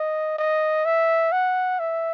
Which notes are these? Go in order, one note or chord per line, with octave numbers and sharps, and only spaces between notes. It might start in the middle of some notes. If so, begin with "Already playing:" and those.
Already playing: D#5
D#5
E5
F#5
E5